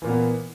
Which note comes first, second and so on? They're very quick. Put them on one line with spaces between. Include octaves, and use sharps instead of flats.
E3 A#2 A#3 B3